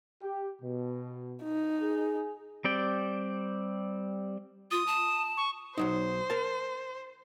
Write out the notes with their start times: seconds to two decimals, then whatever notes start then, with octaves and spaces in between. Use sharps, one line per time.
0.22 G4
0.62 B2
1.44 D#4
1.81 G#4
2.65 G3 C4 D5 G5
4.71 F4 D#6
4.87 A5
5.37 C#6
5.78 B1 F#3 D#4 C5
6.30 A#4 A5